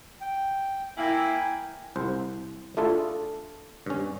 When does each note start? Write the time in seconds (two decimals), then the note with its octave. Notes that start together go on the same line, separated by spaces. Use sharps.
0.21 G5
0.97 A#3 E4 G5 G#5
1.96 C2 C5
2.77 A3 D4 E4 F4 G#4 A4
3.87 G2 C#4